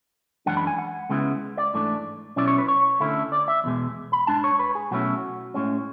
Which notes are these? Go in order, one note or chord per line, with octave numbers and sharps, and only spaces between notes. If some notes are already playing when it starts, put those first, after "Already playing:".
F#2 E3 G#3 D4 F#5
B5
G#5
F#5
C#2 C#3 G#3 B3 E4
D5
G#2 E3 A3 D4
B2 F#3 C#4 E4 D5
C#5
B4
C#5
D2 D3 A3 C#4 E4
D5
E5
E2 B2 G#3
B5
G#2 G#3 D4 A5
C#5
B4
G#4
B2 F#3 A3 C#4 E4 F#4
A2 G#3 C#4